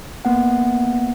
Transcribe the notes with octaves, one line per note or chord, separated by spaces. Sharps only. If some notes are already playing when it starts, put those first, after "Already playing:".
A#3 B3 F#5